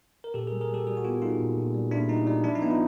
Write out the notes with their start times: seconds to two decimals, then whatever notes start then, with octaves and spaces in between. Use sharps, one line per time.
0.24 A#4
0.34 A#2 G4 A4
0.47 G#4 A#4
0.52 G3
0.61 G#4 A#4
0.70 G3 G4 A4
0.87 G3 F#4 G#4
0.97 F#4
1.04 B3 F4 G4
1.22 G3 D#4 F4
1.39 A#2
1.58 A#2
1.74 G3
1.91 A#2 D4 E4
2.09 G3 D#4
2.27 G3 D#4
2.44 F3 D4 E4
2.55 D#4
2.62 B3 E4
2.71 D#4 F4